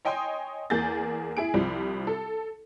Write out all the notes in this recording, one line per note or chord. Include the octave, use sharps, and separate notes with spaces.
C#5 D#5 G5 G#5 C6 D#6
E2 A#3 G#4 G6 A6
E4 G#4 D7
C2 F3 G3
A4